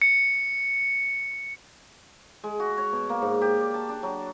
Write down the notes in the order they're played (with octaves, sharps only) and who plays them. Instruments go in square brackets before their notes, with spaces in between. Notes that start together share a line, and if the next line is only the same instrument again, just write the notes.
[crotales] C#7
[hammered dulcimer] G#3
F#4
C#5
B2
A#3
G#2
G4
D5
A5
D4
F#3